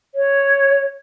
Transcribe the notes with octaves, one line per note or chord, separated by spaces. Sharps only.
C#5